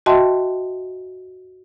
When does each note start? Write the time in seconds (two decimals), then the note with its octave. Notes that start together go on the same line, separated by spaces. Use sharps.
0.06 F#4 D#5 E5 G5 A5 C6